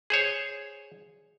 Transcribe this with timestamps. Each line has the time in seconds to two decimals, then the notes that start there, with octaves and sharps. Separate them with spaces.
0.10 G#4 C5 C#5